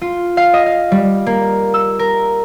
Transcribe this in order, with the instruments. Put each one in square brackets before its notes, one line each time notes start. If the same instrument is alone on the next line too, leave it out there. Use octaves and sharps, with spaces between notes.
[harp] F4
F5
D#5
F5
G3
A#3
E6
A#4